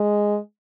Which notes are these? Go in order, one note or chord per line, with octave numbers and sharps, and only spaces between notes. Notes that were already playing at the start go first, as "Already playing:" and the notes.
Already playing: G#3